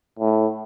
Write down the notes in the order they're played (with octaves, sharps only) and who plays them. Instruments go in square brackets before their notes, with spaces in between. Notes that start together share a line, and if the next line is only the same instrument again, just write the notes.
[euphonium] A2